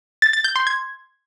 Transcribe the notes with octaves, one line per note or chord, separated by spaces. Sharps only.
A6
A6
G6
C6
G#6